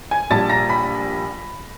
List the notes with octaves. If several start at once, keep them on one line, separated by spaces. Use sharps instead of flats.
G#5 G#6
A#1 A#2 G3 A5 A6
A#5 A#6
B5 B6